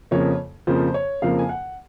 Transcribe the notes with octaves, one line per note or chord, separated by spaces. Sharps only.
F2 C#3 F3 A#3 C#5
F2 C#3 F3 A#3 C5
C#5
F2 C#3 F3 A#3 F5
G#5
F#5